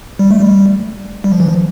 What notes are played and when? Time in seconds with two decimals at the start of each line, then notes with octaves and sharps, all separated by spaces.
0.19 G3
0.31 A3
0.40 G3
1.24 G3
1.32 F3
1.40 E3
1.48 F3